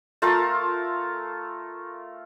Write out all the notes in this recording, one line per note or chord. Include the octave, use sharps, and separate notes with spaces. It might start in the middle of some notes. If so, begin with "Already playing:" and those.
A3 F4 A#4 A5